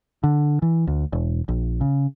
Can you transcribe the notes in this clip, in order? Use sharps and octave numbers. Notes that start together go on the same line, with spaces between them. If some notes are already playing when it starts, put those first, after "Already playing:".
D3
E3
D2
E1
A#1
C#3